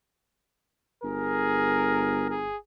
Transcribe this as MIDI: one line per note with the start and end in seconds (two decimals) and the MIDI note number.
1.03 2.60 31
1.03 2.28 68
1.03 2.37 70
2.29 2.57 68